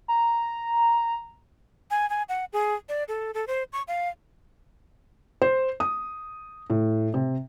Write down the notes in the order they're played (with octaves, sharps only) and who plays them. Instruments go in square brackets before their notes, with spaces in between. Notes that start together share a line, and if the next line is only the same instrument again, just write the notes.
[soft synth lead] A#5
[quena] G#5
G#5
F#5
G#4
D5
A4
A4
C5
C#6
F5
[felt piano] C5
D#6
A2
C3